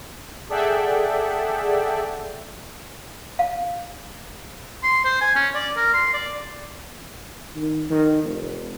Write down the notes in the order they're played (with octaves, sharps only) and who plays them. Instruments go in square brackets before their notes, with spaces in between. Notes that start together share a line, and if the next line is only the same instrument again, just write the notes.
[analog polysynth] G#4 A4 D5 E5 F#5 G5
[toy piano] F5
[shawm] C6
C5
G#5
C#4
D5
A#4
C6
D5
[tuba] D#3
D#3
F1